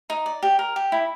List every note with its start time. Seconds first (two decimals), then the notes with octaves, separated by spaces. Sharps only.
0.10 D#4
0.26 D5
0.43 G4
0.59 A#4
0.76 G4
0.92 E4